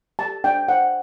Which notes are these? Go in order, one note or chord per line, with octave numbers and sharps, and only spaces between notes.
G4 A5
D4 G5
C5 F#5